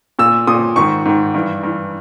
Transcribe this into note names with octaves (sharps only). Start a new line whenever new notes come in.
A#2 E6
A#2 D#6
G#2 D#3 C#6
G#2 D#3
G2 E3
G2 E3